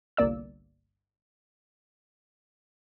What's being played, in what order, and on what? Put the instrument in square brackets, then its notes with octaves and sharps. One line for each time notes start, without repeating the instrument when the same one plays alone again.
[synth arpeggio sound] G1 C2 A#3 D5 E6